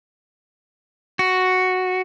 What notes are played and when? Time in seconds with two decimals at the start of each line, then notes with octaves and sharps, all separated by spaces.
1.19 F#4